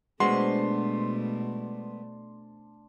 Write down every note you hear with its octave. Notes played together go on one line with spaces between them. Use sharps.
B2 G#3 A3 B3 D4 F#4 C5 C6